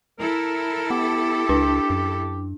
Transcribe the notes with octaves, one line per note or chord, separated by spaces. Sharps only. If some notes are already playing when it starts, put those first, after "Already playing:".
E4 A4 A#4
B3 G4
C#2 D4
F#2